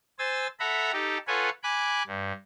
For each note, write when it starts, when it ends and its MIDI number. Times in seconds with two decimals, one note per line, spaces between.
0.19 0.47 72
0.19 0.47 80
0.19 0.47 88
0.19 0.47 93
0.60 0.92 69
0.60 0.92 76
0.60 0.92 78
0.60 0.92 82
0.60 0.92 83
0.93 1.18 63
0.93 1.18 67
0.93 1.18 69
1.27 1.49 65
1.27 1.49 69
1.27 1.49 71
1.27 1.49 73
1.27 1.49 78
1.27 1.49 80
1.63 2.03 80
1.63 2.03 83
1.63 2.03 86
1.63 2.03 90
2.07 2.32 43